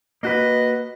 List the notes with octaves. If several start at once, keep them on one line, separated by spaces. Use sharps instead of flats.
A#3 F#4 B4 D#5